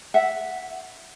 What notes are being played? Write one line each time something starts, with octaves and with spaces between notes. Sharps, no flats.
E5 F#5